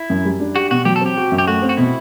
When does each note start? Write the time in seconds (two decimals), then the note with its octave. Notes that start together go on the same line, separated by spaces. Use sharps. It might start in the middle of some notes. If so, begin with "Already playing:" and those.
Already playing: E4
0.10 F#2
0.25 G3
0.40 D4
0.55 F#4 G4
0.71 B2 F#4
0.85 F#3 G4
0.96 A4
1.01 C4 G4
1.17 F#4
1.32 F#2
1.38 G4
1.47 A3 F#4
1.62 C4
1.69 F#4
1.77 B2 E4